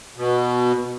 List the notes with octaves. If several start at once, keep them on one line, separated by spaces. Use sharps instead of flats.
B2